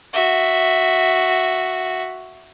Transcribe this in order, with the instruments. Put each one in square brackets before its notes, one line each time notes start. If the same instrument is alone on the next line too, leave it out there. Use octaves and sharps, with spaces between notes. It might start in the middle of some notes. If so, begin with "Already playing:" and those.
[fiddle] F#4 E5